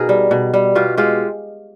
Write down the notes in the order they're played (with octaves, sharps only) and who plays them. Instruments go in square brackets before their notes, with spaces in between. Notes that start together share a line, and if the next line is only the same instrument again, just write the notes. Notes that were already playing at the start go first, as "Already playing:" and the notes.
Already playing: [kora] B2 D#4 G#4 A#4
G3
B2
G3
B2 F4 G4
G#3 F4 G4